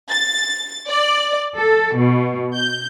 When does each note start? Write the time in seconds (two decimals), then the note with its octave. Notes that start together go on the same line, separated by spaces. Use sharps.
0.10 A6
0.89 D5
1.56 A4
1.96 B2
2.54 G6